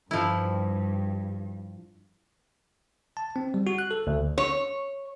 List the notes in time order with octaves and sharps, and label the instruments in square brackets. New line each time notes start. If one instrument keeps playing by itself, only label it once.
[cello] G2 G3 [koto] F3 E4
[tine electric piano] A5
C4
G3
F#4
F#6
A4
D2
[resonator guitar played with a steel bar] C#5